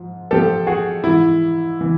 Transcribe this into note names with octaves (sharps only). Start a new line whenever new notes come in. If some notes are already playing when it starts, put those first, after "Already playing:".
Already playing: G#2 F3
G#2 F3 G4 A4
F#4 G#4
G#2 E3 E4
E3